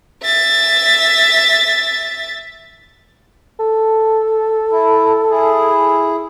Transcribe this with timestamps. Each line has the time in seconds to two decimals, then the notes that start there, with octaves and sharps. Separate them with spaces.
0.24 E5 A6
3.60 A4
4.71 E4
5.31 E4 G#4